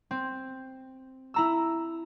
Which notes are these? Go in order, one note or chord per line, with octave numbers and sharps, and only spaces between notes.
C4
E4 A#5 E6